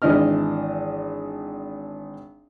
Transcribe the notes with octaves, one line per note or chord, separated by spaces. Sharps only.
G#1 E3 D4 D#5 F6